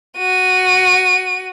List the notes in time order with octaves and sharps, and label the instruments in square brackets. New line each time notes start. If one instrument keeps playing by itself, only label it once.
[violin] F#4 D#7